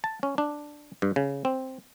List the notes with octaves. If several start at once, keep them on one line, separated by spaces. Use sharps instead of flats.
A5
C#4
D4
G2
C#3
C4